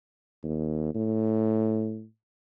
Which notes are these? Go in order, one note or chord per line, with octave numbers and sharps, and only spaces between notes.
D#2
A2